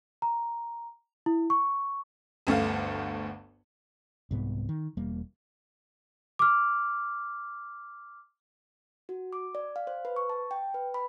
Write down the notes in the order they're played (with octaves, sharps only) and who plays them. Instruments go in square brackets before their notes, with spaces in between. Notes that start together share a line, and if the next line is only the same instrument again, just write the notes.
[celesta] A#5
E4
C#6
[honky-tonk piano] G1 D2 A3 F5
[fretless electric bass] C2 G#2 B3
D#3
E1 G3 A#3
[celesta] D6 F6
[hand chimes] F#4
D6
D5
F5
C5
B4
C#6
A5
G5
B4
B5